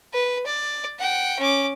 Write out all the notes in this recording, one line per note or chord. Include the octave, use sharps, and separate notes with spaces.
B4
D5
F#5 G5
C#4 D6